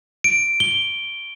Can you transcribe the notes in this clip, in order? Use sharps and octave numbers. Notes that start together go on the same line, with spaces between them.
D7
G7